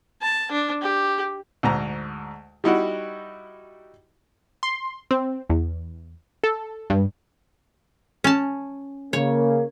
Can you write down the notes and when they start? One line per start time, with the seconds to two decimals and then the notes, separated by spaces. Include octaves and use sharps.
0.22 A5
0.51 D4
0.82 G4
1.63 D2 G#2 A#5
2.64 G3 D#4 E4 F#4
4.63 C6
5.11 C4
5.50 E2
6.44 A4
6.90 G2
8.24 C#4 A5
9.13 C#3 A#3 C#5